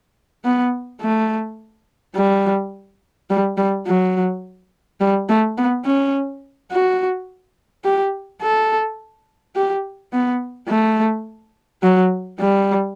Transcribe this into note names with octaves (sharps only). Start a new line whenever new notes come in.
B3
A3
G3
G3
G3
F#3
G3
A3
B3
C#4
F#4
G4
A4
G4
B3
A3
F#3
G3